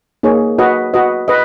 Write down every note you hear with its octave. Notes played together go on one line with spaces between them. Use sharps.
A#3 D#4 G#4 C#5
F#4 B4 D#5
F#4 B4 D#5
B4 D#5